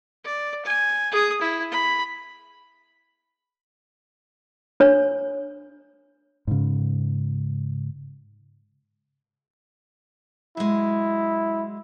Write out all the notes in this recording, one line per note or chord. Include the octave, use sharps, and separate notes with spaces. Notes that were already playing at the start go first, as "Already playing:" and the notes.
D5
G#5
G#4 D#6
E4
B5
D4 C#5
G#2 C#3
F#3 G#3 E4